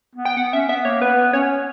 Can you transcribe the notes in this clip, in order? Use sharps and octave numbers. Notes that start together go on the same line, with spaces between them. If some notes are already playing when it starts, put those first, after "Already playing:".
B3
G5
B3 F#5
C#4 E5
B3 E5
A#3 C#5
B3 B4
C#4 C#5